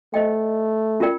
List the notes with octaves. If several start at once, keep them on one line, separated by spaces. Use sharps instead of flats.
A3 C5 D#5 G5
C#4 F4 A#4 D5 G5